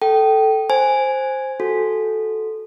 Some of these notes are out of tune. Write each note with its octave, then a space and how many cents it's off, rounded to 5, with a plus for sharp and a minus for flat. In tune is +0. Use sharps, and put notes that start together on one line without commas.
A4 +0 G5 -20
C5 +5 G#5 +0
F#4 +0 A4 -10